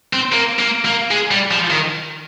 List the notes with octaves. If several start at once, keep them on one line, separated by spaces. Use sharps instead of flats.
C4
A#3
A#3
A#3
G#3
G3
F3
D#3